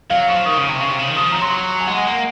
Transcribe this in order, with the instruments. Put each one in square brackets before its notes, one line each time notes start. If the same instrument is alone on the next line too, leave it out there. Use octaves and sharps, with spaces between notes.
[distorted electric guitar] F#3 [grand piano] F5
[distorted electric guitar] F3 [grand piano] C#6
[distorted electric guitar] D#3 [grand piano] D#6
[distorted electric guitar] C#3
[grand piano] C#6
[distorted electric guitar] C3
C#3
C3
C#3
D#3
[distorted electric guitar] F3 [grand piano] D#6
[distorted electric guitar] F#3 [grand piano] A#5
[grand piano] C6
C#6
G#5
[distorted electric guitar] G#3 [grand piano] F#5
[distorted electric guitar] A#3